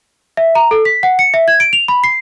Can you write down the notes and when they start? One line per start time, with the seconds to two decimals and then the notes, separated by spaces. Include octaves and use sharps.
0.37 E5
0.55 A#5
0.71 A4
0.85 B6
1.03 F#5
1.19 C#7
1.34 E5
1.48 G#6
1.60 D7
1.73 F7
1.88 B5
2.04 C7